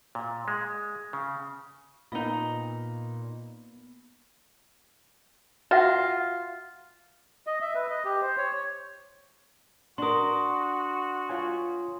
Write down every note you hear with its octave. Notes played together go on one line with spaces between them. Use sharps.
A#2
G#3
C#3
A#2 A#3 B3 D#4 D#5 B5
F4 F#4 E5 F#5
D#5
E5
B4
D#5
G4
C5
C#5
D4 F#4 A#4 C6 D#6
F4 C#5 G#5